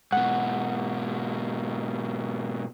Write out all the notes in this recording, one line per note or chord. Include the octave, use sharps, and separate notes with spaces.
G#2 B2 F#5